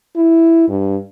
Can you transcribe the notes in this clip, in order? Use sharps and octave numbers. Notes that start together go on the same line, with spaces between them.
E4
G2